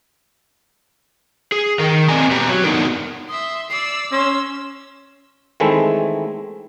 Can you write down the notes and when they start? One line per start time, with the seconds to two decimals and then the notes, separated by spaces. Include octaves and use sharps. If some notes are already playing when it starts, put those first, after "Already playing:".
1.52 G#4
1.79 D#3 A#4
2.08 C4 D5 D#5 G#5 A#5
2.31 E2 B2 B3 G4 B4 A#5
2.48 F#3
2.64 B3 D4 D#4 A#4
3.29 E5 C6 D#6
3.70 D5 E6 C7
4.12 C#4 C6 E6
5.60 D#3 E3 G#3 A3 C4 E4